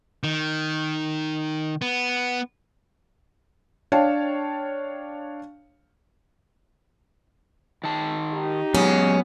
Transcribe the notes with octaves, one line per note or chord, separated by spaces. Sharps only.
D#3
B3
D4 C#5 F5 G5 A5
D#3 A5
D#4 G4
F#3 G#3 B3 C#4